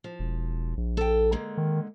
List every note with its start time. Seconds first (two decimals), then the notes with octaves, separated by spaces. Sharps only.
0.04 F3
0.19 E1
0.77 A#1
0.97 A4 G5
1.32 D3 G#3 A#3
1.57 D#3